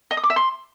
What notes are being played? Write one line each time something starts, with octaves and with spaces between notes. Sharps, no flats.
D#5
D#6
D6
E5
C6